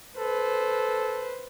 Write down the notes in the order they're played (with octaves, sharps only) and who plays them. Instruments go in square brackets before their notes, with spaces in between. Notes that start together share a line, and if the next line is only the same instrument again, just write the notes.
[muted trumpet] A4 [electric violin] B4 C5